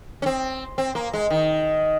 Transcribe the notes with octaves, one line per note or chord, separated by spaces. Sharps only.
C#4
C4
C4
A#3
G#3
D#3